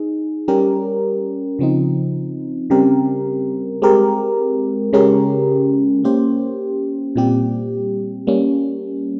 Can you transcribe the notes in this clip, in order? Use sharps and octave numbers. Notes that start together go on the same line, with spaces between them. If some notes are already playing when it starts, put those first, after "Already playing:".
Already playing: D#4 G#4
G3 C#4 G4 A#4
C#3 F3 C4 D#4
C#3 G3 C4 G4 A#4
G#3 C4 G4 A#4
C#3 G#3 C#4 G4 A#4
A#3 C#4 G4 C5
A#2 G3 C4 G4
G3 A#3 C#4